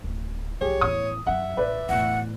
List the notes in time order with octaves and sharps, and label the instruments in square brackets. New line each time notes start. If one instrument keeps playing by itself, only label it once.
[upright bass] D1
[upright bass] B1 F3 [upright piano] G4 G#4 [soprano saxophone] C#5
[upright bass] E2 A2 [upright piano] D#6
[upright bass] F#2 F#3 [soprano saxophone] E5 [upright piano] F#5
[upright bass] A1 [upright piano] B4 D5
[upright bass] E2 A2 [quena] F#5